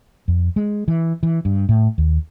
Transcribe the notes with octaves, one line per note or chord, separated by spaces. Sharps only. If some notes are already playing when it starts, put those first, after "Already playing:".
F2
G#3
E3
E3
G2
A2
D#2